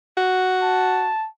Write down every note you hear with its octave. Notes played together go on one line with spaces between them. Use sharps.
F#4
A5